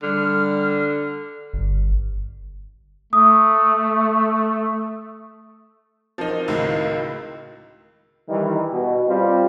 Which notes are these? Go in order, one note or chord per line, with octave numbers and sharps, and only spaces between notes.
D3 G3 F6
G1
A3 D#6
F3 C4 D#4 F#4 A#4
C#2 A2 D#3 F#4 A#4 E6
D#3 E3 G3
B2
G3 C4 F4